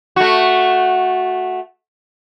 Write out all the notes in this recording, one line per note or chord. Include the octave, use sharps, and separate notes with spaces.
A3 F#4